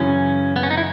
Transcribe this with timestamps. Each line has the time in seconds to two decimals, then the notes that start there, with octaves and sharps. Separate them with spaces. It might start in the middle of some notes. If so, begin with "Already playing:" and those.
Already playing: F#2 C#3 E3 C#4
0.56 B3
0.63 C#4
0.70 D#4
0.77 E4